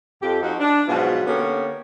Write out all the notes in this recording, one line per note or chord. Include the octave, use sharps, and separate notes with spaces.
F2 G4
F2 F3 D#4 F#4
D4
G#2 B2 F3 F#3 F4 F#4
D3 A#3 B3 C#4 G4 C#5